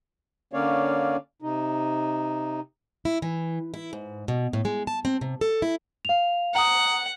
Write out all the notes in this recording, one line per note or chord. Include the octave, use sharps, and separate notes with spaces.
D3 A#3 C#4 C#5 D5 F5
C3 D#4
E4
E3
E4
G#2
B2
A2
G#3
A5
C4
C3
A4
E4
F5 F7
F#5 A#5 D#6